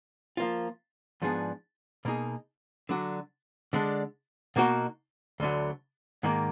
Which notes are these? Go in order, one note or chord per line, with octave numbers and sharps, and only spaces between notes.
F3 A#3 F4
G#2 F3 B3 D4 G#4
B2 A#3 D#4 G#4
D3 F#3 D4 F#4
D3 G#3 D4
B2 A#3 D#4 F#4 A#4
D2 D3 F#3
G#2 D#3 A#3